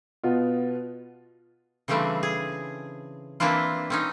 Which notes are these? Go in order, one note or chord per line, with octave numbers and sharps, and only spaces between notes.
B2 B3 F4
C#3 E3 G3 A3 C4 D4
G#4
E3 A#3 C4 D4 E4 F4
C4 C#4 D#4